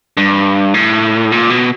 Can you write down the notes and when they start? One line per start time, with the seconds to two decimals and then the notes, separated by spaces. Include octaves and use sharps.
0.17 G2
0.74 A2
1.32 A#2
1.50 B2